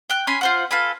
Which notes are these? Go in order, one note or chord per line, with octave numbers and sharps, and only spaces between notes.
G5 F#6
C#4 G#5 B5 C6
F4 C5 F#5
F4 A4 B4 G#5